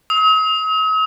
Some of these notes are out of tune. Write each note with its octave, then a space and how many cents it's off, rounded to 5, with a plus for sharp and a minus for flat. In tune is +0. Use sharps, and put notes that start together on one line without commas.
D#6 +45